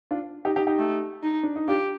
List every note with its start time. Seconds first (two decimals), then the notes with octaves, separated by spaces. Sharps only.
0.11 D4 F4
0.45 D#4 G4
0.56 D#4 G4
0.67 D#4 G4
0.78 A3
1.23 D#4
1.43 D4
1.56 D#4
1.68 D4 F4 G4